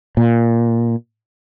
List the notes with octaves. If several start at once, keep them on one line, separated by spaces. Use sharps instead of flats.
A#2